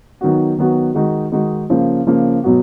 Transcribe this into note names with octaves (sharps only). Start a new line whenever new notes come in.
D#3 F#3 B3 F#4
D#3 F#3 B3 F#4
D#3 G#3 D#4 F#4
D#3 G#3 D#4 F#4
C#3 F3 A#3
C#3 F3 A#3
B2 F#3 B3 F#4